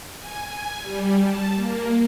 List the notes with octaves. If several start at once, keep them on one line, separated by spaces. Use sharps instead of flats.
G#5
G#5
G3
A5
A#3